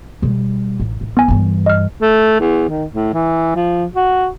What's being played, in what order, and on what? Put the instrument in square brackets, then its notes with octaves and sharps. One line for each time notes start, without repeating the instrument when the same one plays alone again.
[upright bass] B2 G3
A1
A1
[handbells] B3 G#5
[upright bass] G2 E3
[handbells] D#5 F6
[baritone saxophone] A3
E2
D#3
A2
E3
F3
F#4